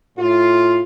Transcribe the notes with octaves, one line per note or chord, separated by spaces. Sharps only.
A2 F4